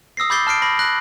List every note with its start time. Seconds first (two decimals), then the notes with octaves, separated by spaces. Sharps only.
0.17 D#6 E6 A#6 C7
0.30 B5 D6 G6 A6 C7 G7
0.47 A5 F6 C7 D7
0.62 B5 A#6
0.79 F#6 A#6 F#7